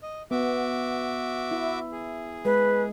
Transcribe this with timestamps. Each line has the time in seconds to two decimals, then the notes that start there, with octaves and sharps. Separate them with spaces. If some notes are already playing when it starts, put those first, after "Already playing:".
0.03 D#5
0.31 B3 F#4 E5 D6
1.51 E4
1.92 G#4
2.45 G#3 B4